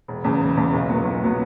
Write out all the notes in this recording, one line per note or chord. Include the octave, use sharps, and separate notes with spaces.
E1
E2 C#3
E1
E2 C#3
B1
A#2 F#3 B3
B1
A#2 F#3 B3